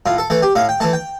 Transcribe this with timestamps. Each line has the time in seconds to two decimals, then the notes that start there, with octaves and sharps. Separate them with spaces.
0.06 A2 F4
0.18 A4
0.30 E3 A3 A4
0.42 G4
0.55 A2 F5
0.69 G5
0.80 E3 A3 A5
0.93 G5